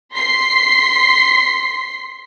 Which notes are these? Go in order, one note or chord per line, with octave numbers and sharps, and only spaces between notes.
C6 B6 C7